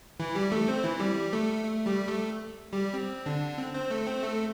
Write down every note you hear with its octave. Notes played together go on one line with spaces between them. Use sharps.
E3 E4
G3 G4
A3 A4
C4 C5
E3 E4
G3 G4
A3 A4
A3
G3 G4
A3 A4
G3 G4
C4
D3 D4
C4
C4 C5
A3 A4
C4 C5
A3 A4